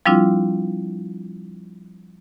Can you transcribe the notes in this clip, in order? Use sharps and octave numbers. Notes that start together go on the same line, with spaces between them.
F3 G3 C4 D4 E4 F4